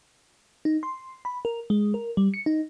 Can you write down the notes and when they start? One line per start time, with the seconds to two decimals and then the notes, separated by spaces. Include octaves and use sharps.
0.65 D#4
0.83 C6
1.25 B5
1.45 A#4
1.70 G#3
1.94 A#4
2.17 G3
2.34 C#7
2.46 D#4